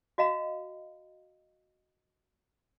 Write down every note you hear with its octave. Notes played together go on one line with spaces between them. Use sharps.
F#4 D#5 F5 A#5